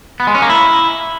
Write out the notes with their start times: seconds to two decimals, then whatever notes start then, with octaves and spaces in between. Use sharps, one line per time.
0.20 B3
0.27 G#3
0.35 C#4
0.42 A#3
0.49 E4